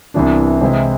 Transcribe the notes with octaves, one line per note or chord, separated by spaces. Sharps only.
C2 C3 E3 B3 D4
C3 E3 G#3 C4 E4